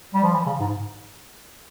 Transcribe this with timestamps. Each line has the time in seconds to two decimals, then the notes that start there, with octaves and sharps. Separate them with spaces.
0.14 G3
0.23 F3
0.33 E3
0.46 C#3
0.60 G#2